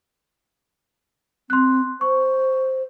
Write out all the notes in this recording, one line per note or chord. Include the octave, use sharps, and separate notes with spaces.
C4 C6 F#6
C5 C#6